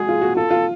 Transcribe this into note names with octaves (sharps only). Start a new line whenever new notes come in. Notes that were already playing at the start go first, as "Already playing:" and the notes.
Already playing: G#3 F#4 G#4
F4
F#4
F4 A4
F4